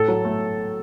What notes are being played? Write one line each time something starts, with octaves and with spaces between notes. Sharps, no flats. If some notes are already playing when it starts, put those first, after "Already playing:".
Already playing: A2 A4
F#3
A3